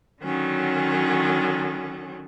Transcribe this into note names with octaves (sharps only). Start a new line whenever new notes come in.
D3 D#3 F#3 C#4